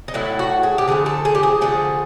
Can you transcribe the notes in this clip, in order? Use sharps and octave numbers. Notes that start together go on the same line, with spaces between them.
D#4
A2 F#3 A3 E4
F#4
G#4
G4
D3 F3 A3 G#4
A4
G#4
G4
G#4
D3 F3 A3 G#4